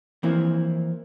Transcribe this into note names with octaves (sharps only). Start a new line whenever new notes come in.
E3 F3 A#3 C4 E4